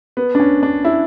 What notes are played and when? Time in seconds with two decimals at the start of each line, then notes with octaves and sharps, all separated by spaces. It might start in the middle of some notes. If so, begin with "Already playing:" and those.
0.17 B3
0.35 D4
0.40 C#4
0.63 D4
0.85 E4